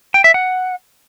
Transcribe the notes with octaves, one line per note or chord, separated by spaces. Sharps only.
G5
E5
F#5